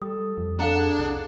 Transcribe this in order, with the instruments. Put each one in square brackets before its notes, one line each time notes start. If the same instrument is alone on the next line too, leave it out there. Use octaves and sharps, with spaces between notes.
[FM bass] G3 [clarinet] A4 [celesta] D#6
[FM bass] F2
[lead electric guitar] D4 [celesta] A4 F5 A#5 [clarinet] F#5
[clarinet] G#4
[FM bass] C2